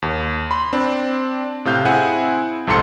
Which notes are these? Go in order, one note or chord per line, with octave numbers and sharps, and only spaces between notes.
D#2
B5 C6
C4 D4
A2 C3 F5 G6
C4 E4 G#4 F#5 G#5
C2 F2 G#2 A4 C6 C#7